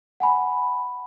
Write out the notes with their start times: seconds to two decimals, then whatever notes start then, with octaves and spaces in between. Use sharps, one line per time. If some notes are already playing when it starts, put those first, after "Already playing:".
0.20 F#5 G#5 B5